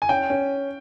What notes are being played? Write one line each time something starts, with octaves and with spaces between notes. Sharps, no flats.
G#5
C#4 G5
C#4